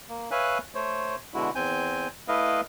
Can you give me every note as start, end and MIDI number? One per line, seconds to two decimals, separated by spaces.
0.09 0.29 58
0.31 0.58 71
0.31 0.58 73
0.31 0.58 76
0.31 0.58 77
0.31 0.58 80
0.31 0.58 90
0.75 1.16 57
0.75 1.16 72
0.75 1.16 73
1.34 1.50 47
1.34 1.50 50
1.34 1.50 56
1.34 1.50 64
1.34 1.50 66
1.55 2.08 40
1.55 2.08 60
1.55 2.08 80
1.55 2.08 91
2.28 2.61 57
2.28 2.61 64
2.28 2.61 71
2.28 2.61 75
2.28 2.61 77